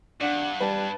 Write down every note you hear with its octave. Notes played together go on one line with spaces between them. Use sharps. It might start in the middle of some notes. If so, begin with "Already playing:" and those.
G2 D4 F#5
G3 B4 A5